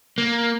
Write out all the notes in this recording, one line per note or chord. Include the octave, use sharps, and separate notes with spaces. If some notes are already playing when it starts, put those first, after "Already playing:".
A#3